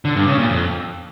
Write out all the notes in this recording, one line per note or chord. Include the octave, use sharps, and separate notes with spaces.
D3
G2
C#3
A#2
F2